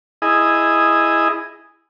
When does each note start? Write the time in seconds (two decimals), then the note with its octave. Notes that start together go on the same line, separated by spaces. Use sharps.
0.22 E4 G#4 D#5